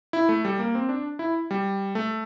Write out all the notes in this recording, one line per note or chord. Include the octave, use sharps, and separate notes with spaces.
E4
A3
G3
A#3
C4
D4
E4
G3
A3